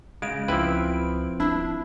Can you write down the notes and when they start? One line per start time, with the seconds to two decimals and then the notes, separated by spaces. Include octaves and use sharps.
0.22 C#3 G#3 D7
0.48 C#2 F3 C4 E4 B4
1.40 D#1 D4 E4